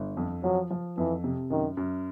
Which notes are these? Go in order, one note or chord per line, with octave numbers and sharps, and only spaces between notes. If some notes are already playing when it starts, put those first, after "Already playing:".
Already playing: G1
F2
F3 F#3
F3
F2 E3
C3
F#2 D#3
F#2